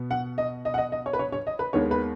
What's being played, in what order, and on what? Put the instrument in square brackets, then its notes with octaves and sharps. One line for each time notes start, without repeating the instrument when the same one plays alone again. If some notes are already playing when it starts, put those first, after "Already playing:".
Already playing: [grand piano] B2 B3
F#5
D#5
D#5
F#5
D#5
D#5
C#5
B4
C#5
C#5
D#5
B4
D#2 D#3 G#3 B3 C#5
B4